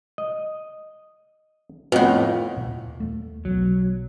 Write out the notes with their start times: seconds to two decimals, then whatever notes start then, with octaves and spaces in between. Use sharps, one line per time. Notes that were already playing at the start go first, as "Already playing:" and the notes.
0.18 D#5
1.92 F2 A2 B3 F#5
2.56 D#2 A#2
3.00 D#2 A3
3.45 B1 F#3